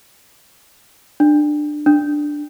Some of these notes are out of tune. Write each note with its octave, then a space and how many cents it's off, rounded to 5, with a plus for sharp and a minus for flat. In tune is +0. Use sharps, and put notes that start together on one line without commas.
D4 +20
D4 +5